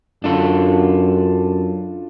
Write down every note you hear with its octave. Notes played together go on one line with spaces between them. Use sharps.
F#2 D4 F4 A4